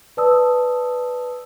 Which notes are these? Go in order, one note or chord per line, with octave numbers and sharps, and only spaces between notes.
B4 D5 A5 D#6 E6